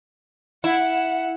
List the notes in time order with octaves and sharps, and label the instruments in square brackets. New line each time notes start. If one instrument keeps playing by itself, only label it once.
[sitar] E4 [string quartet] F#5